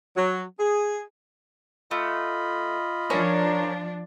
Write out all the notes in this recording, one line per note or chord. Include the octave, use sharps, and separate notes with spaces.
F#3
G#4
A3 F4 D#5 B5
F3 C#4 D4 A#4 C#5